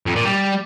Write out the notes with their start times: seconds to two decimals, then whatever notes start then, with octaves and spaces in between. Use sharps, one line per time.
0.06 F2
0.16 A#2
0.25 G3